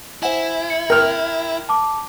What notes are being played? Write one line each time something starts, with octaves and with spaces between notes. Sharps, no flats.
E4 C5 F#5 G#5
C#7
A#4 G5 F6 G6 F7
A5 D6